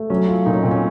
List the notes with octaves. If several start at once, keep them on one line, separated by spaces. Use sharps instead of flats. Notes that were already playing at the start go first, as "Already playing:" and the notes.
Already playing: A3
F#3 C#4
F4
A#2 D#4
C#4
A#2 C4
C#4